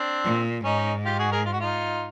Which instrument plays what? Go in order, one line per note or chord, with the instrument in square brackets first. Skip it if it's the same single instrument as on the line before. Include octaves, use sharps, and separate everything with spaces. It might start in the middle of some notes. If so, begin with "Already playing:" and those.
Already playing: [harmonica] C4 D4
[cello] A#2
[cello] G#2 [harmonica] C#4 D#4
[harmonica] F4 G4
F#4 G#4
G#4 A#4
F4
F#4
D#4 F4